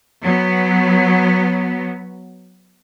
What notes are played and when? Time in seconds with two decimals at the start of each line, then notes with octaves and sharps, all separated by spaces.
0.23 F#3 B3